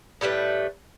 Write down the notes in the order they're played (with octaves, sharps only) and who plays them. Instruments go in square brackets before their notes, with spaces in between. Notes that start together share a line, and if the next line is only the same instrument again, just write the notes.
[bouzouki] A2 G3 A3 B4